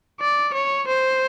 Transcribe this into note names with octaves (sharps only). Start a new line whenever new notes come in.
D5
C#5
C5